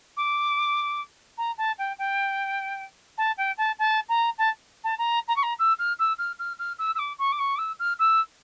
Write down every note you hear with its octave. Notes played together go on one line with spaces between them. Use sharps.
D6
A#5
A5
G5
G5
A5
G5
A5
A5
A#5
A5
A5
A#5
A#5
C#6
A#5
E6
F6
E6
F6
F6
F6
E6
E6
D6
C#6
D6
C#6
D6
E6
F6
E6